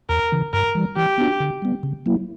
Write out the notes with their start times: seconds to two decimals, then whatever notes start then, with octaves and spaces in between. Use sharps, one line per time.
0.09 E2 A#4
0.32 C#3 E3
0.53 G2 A#4
0.75 E3 G3
0.96 E3 G4
1.18 B3 D4 F#4
1.40 D3
1.62 G3 B3
1.83 C#3
2.06 F#3 A#3 E4